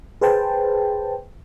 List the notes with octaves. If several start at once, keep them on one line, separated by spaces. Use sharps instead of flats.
G#4 B4 C5 G5 A5